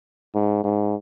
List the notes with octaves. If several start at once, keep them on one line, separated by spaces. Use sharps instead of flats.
G#2
G#2